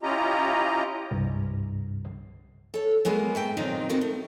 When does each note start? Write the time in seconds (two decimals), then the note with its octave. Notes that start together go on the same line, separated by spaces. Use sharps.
0.03 C#4 E4 F4 G4 D#5 A#5
1.11 C2 G2
2.74 A4 C#5
3.05 F#3 G#3 A#3 B3
3.35 A2 E5 G5
3.57 A#2 D#3 F#3 C4 D#4 F4
3.89 B3 C4 D#4 F#4 A#4
4.01 A3